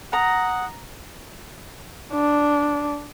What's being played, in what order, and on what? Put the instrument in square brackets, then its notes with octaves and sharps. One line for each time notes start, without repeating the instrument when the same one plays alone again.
[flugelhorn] F#5 [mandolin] A#5 [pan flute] D#6
[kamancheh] D4